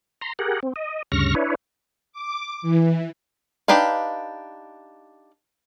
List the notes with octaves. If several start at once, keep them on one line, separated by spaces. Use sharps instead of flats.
A#5 C6
G4 G#4 A#4 F#5
C4
D#5
D2 G2 C#3 C#6 F6 A#6
D4 E4 B4 C#5
D6
E3
D4 D#4 G4 B4 F5